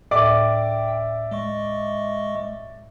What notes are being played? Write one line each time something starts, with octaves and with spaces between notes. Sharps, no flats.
D2 A2 D5 E5 G5 D6
G#3 D#5 C#6